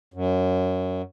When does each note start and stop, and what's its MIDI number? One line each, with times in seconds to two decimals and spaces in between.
0.14 1.02 42